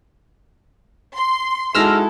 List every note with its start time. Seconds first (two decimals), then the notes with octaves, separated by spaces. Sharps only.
1.15 C6
1.75 G#3 D#4 E4 F#4 A4 E6 F6 A#6